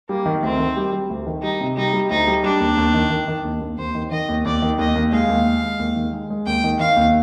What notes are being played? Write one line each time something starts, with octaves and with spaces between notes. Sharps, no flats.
G3 A#3
D#3
D2 C4
D#3
G3
G3
D2
D#3
G3 D#4
C3
G3 D#4
G3
D2 D#4
G3
G3 D4
D#2
D#2
D#3
D#3
D#3
D#2
D#2
D#2 C5
D#3
D#3 D#5
D#2
D#2 D5
D#3
D#2 D#5
D#2
G#3 F5
D#2
G#3
G#3
D#2
D#3
G#3
G#3
D#2 G5
D#3
D#3 F5
D#2